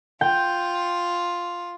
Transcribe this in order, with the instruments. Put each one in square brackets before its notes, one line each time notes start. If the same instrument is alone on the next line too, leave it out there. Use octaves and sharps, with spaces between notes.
[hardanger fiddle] F4 [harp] G5